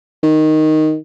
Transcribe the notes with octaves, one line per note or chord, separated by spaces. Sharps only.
D#3